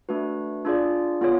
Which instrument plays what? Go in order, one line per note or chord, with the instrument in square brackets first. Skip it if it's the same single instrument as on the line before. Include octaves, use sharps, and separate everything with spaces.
[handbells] A3 D4 F#4 B4
D4 F4 G#4 D5
B3 F4 G#4 C#5